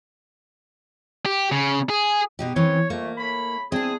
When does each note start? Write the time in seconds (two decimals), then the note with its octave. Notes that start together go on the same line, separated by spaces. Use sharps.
1.26 G4
1.52 C#3
1.90 G#4
2.39 B2 D#4 G4
2.56 E3 C4 C#4 C#5
2.90 F2 A3 A#3
3.18 A2 C#5 B5
3.72 C4 D4 E4 G#4 A5